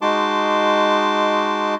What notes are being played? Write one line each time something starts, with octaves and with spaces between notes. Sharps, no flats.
G#3 D#4 F#4 A5 C6 D6